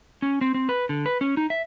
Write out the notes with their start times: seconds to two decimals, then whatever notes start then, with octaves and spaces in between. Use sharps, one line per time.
0.22 C#4
0.41 C4
0.54 C4
0.69 B4
0.89 D3
1.06 B4
1.21 C#4
1.37 D#4
1.50 E5